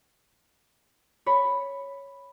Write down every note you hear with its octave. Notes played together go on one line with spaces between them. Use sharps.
C#5 B5